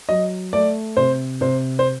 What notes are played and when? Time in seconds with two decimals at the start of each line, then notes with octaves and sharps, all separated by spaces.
0.09 F#3 D#5
0.53 A3 D5
0.97 C3 C5
1.41 C3 C5
1.79 C5